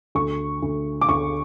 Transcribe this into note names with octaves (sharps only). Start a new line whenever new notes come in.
D2 C#6
D2
D6
D2 C#6